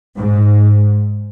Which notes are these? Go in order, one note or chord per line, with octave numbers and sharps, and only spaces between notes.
G#2